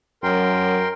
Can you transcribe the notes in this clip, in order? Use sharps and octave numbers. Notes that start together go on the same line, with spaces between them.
F#2 A#4 G5 C6